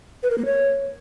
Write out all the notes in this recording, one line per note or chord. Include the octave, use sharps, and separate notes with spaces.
B4
A#4
A#3
C#5